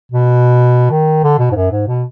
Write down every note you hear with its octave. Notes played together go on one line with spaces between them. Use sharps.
B2
D#3
D3
B2
G#2
F#2
G#2
B2